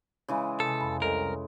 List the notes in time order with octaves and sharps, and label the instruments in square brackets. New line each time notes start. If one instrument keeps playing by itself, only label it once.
[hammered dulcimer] C#3 E3 G#3
[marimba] C3 [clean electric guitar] A4
[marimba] F2 B5
[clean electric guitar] C2 A#4 [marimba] A4 D#5 A#5